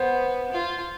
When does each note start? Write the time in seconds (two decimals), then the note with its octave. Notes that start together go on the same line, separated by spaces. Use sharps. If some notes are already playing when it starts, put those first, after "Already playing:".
Already playing: B3 C5
0.52 F4